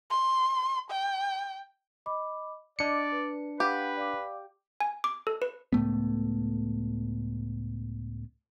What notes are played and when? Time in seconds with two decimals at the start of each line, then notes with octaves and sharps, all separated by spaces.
0.10 C6
0.91 G5
2.06 D#5 B5 D6
2.79 D4 D5 D#5 D6 C#7
3.12 B4
3.60 G4 B4 F5 F#5 B5
3.97 D5 F5 D6
4.80 G#5
5.04 D6
5.27 A4
5.42 B4
5.73 C#2 A2 A3 B3